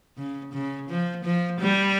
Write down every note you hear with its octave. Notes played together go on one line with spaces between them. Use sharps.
C#3
C#3
F3
F3
G3